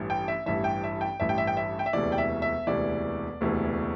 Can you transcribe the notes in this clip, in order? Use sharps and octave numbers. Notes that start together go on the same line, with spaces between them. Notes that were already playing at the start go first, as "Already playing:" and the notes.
Already playing: A1 G2 E3
G5
E5
A1 G2 E3 E5
G5
E5
G5
A1 G2 E3 E5
G5
E5
G5
E5
G5
E5
E1 D2 C3 E3 D5
G5
E5
E5
E1 D2 C3 E3 D5
E1 D2 C3 E3